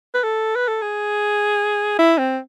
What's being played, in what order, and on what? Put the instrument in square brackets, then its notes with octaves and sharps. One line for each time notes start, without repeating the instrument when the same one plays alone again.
[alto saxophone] B4
A4
B4
A4
G#4
E4
C4